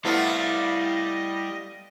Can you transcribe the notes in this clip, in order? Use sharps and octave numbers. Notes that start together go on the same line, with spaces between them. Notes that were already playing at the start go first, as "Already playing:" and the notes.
G3 A3 B3 E4 F4 C5 D#5